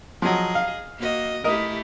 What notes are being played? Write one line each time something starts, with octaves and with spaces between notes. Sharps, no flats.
F3 F#3 G#4 D#5
F5
A#3 F#4 D#5
A3 E4 G4 A#4 D#5